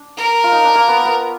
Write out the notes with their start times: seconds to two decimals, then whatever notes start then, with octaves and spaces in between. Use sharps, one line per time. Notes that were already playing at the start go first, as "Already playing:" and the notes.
Already playing: D4
0.17 A#4
0.44 F4
0.52 D#4
0.64 D4
0.75 A#3
0.88 B3
1.05 B3